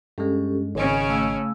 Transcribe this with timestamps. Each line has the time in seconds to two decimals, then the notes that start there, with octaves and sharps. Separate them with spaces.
0.18 G2 G#3 C#4 G4 A4
0.75 G#1 C#3 C#4 C#5 D#5 G#5
1.09 A3 F5 E6